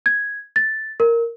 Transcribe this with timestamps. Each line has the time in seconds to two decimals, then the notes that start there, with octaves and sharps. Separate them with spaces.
0.06 G#6
0.56 A6
1.00 A#4